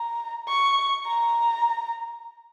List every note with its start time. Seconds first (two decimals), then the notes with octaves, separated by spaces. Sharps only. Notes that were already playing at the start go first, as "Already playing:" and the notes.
Already playing: A#5
0.49 C#6
1.07 A#5